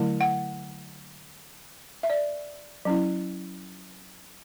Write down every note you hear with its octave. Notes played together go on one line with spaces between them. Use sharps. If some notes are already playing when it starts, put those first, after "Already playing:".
Already playing: D3 F#3 A3 E4
F#5
E5
D5
F#3 C#4 E4